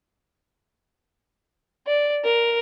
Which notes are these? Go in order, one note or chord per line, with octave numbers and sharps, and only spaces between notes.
D5
A#4